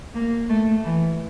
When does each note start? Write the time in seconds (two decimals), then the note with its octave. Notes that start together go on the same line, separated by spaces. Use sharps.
0.14 A#3
0.49 A3
0.84 E3